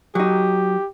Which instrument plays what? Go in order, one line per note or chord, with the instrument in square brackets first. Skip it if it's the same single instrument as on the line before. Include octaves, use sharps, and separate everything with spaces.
[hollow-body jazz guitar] F#3 D#4 [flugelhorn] G4